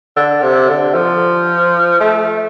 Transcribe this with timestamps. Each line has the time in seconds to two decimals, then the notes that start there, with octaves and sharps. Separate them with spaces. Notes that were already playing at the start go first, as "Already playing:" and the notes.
0.16 D3
0.43 C3
0.69 D3
0.95 F3
2.01 A3